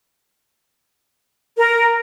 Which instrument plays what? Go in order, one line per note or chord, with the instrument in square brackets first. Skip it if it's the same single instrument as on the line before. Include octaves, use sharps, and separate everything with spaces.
[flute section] A#4